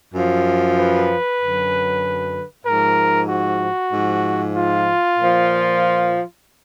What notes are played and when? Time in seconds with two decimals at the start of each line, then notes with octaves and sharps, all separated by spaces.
0.13 F#2 F3
0.77 B4
1.40 F#2 D3 F#3
2.66 G#2 F3 A#4
3.30 F#4
3.93 G#2 F3
4.56 F4
5.19 A#2 F3